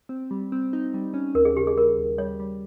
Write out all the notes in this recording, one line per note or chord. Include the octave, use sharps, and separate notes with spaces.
C4
G3
C4
D#4
G3
C#4
D#2 A#4
G#4
C#3 G4
G#4
G3 A#4
D#2
G3 C#5
G3